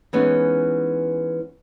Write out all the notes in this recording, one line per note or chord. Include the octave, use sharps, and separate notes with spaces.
E3 G#3 B3 C#4 D#4